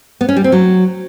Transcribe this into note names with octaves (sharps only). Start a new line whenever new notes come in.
B3
C#4
G3
C4
F#3